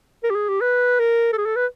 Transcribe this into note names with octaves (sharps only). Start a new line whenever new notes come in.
A#4
G4
G#4
G4
B4
A#4
A4
G#4
A4
B4